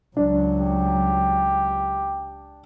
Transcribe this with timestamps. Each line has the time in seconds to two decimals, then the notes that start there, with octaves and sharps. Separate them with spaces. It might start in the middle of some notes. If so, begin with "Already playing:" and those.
0.17 C#2 F#3 D4
0.60 G4